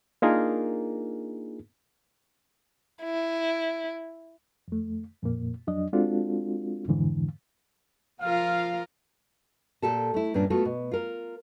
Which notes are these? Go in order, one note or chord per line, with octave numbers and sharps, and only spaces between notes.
A#3 D4 D#4 F4 G#4 A#4
E4
F2 A3
F2 A#2 A#3
F2 F#3 D4 D#5
G#3 C4 D4 F4 F#4 A4
F2 G#2 D3 E3
F3 F4 A#4 F5
A#2 G4 A4 A5
A3 E4
G2 A#2 C#4 D4
A3 B3 F4 F#4 A4
B2
F4 A#4